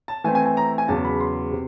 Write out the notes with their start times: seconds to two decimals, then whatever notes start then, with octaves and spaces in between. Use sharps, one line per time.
0.08 A5
0.24 E3 A3 C4 E4 G#5
0.35 G#5
0.46 G#5
0.57 A#5
0.78 G#5
0.88 E2 C#3 F#3 A5
1.05 B5
1.20 C6
1.52 C3